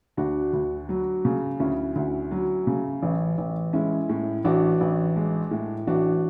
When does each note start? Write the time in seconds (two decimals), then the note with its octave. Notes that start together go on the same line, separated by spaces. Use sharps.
0.17 D2 D4 F#4
0.53 D2
0.89 F#3
1.25 C#3
1.60 D2 C#4 E4
1.96 D2
2.31 F#3
2.67 C#3
3.03 A1
3.38 A1
3.73 G#3 C#4 E4
4.09 A2
4.45 A1 D4 F#4
4.81 A1
5.16 G#3
5.51 A2
5.87 A1 D4 F#4